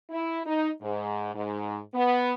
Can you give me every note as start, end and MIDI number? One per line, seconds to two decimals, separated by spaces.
0.10 0.40 64
0.45 0.69 63
0.81 1.32 44
1.34 1.79 44
1.94 2.32 59